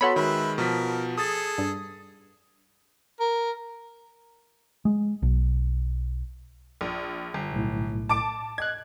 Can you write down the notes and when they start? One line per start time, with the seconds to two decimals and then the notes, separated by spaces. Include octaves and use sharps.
0.01 B3 F#4 A4 C#5 B5 C6
0.16 D#3 G#3 B4 E5
0.58 B2 F3 A#4 B6
1.18 G#4 A4 D#6 A6
1.58 G2
3.20 A#4
4.85 G#3
5.22 B1
6.81 A#1
7.34 G1
7.52 B1 A2
8.09 A5 D6 D7
8.58 D#5 F#6 G#6